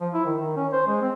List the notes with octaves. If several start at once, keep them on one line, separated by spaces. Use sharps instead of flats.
F3
E4
D#3
D#3
C#4
C5
G#3
C4